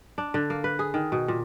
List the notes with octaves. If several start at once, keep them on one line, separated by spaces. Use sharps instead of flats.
D4
D3
A#3
B4
G#4
D#3
B2
A#2